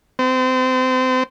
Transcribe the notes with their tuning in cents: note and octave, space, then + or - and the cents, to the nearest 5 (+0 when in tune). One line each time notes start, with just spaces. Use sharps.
C4 -30